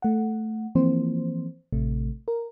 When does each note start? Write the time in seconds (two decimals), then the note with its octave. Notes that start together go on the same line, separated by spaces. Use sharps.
0.02 A3 F#5
0.75 E3 F3 A#3 C4 C5
1.72 A1 C3 A3
2.28 A#4